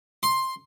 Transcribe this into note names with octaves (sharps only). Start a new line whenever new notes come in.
C6